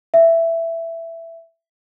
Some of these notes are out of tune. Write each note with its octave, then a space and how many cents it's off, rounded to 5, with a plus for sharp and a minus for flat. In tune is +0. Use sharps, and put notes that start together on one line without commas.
E5 +10